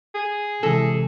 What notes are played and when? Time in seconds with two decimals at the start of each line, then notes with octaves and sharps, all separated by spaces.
0.15 G#4
0.63 C3 E3 G#3 A4 A#6